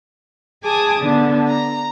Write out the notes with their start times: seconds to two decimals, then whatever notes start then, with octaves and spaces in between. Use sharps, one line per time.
0.62 G#4 G#5 A5 D6 D#6
0.99 D3 B3 D4
1.47 A#5